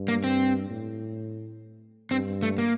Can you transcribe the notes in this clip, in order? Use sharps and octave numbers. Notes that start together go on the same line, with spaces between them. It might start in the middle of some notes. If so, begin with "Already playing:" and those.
Already playing: G2
A#3
C4
A2
G2 C4
A3
A#3